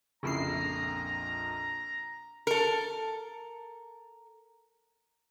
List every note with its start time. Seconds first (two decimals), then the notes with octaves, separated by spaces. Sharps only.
0.23 A#1 F2 A#2 C#3 E4 A#5 C7
2.47 A4 A#4